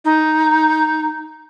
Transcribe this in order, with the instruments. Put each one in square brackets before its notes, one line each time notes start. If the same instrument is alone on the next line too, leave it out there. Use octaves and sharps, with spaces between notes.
[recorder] D#4